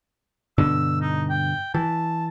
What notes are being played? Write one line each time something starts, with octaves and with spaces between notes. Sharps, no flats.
G2 B2 D3 E6
D#4
G5
E3 A5